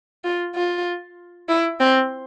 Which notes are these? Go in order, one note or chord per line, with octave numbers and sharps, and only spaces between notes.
F4
F4
E4
C4